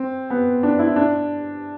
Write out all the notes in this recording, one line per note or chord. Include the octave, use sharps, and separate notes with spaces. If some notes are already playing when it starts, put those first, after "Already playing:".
Already playing: C4
B3
D4
E4
D4